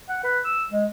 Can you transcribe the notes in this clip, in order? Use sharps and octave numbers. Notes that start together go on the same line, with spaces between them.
F#5
B4
E6
G#3